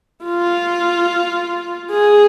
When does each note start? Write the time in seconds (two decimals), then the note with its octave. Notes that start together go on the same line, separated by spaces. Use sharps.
0.25 F4
1.91 G#4